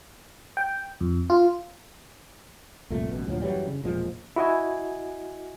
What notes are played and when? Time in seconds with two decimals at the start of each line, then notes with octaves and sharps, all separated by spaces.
0.57 G5
1.01 F2
1.30 F4
2.90 C2 F2 A#2 A3
3.09 A1 F#2 B2
3.27 D2 A#2 F3 F#3
3.42 F#2 E3 F#3 G3
3.67 C#3
3.83 E1 A#2 F3 G#3
4.36 E4 F#4 D#5 G#5